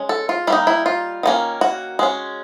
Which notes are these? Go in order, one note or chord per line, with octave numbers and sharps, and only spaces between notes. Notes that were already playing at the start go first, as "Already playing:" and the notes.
Already playing: G#3 C#4
A4
F4
G3 A#3 D#4 E4
E4
F4
D#3 G3 A#3 C#4
F#4
G#3 C#4